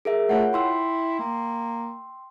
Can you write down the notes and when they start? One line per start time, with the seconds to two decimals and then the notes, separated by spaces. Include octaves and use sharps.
0.05 G#4 A#4 E5
0.29 A3 F4 C#5 F#5
0.53 E4 G5 C6 E6
1.19 A#3